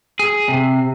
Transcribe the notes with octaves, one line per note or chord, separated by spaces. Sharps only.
G#4
C3